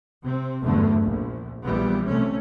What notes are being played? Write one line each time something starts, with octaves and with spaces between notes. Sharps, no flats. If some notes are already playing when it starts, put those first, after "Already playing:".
C3 C4
F#1 E2 G2 D3 A3
A#1
A#1 A#2 E3 G3 B3
C3 A3 C#4